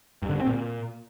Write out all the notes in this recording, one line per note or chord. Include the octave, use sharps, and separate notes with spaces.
G2
D3
G2
C4
A#2